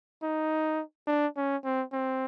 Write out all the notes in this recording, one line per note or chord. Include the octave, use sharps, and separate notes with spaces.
D#4
D4
C#4
C4
C4